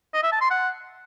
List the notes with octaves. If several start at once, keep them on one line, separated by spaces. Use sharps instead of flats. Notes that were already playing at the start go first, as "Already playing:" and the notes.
D#5
E5
A5
C6
F#5